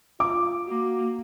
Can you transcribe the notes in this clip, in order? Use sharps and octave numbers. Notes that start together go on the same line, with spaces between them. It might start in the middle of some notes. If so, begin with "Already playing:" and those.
F4 D6
A#3 F#4